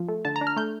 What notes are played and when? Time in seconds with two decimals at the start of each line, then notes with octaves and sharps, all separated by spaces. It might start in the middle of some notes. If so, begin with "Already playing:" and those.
Already playing: F3
0.09 A3
0.25 D3 A5
0.36 A#5
0.41 D4
0.47 F6
0.57 A3 G6